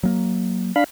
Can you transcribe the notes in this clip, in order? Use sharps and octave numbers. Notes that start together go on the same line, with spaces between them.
F#3 A#3
D4 F5 B5